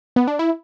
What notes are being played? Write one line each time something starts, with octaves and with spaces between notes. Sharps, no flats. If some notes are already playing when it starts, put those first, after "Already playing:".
B3
D4
E4